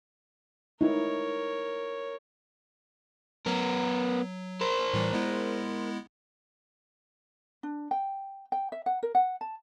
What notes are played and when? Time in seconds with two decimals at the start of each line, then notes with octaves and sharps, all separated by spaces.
0.81 D#4 E4 A#4 C#5
3.46 F#3 B3 A#4
4.61 A#4 C5
4.94 A2 E3 G3
5.13 G#3 B3 E4
7.63 D4
7.91 G5
8.52 G5
8.72 E5
8.86 F#5
9.03 A#4
9.15 F#5
9.41 A5